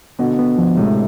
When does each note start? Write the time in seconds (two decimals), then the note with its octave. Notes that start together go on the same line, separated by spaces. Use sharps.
0.19 B2 D3 B3
0.39 B3
0.58 F3
0.77 A2 C3 G#3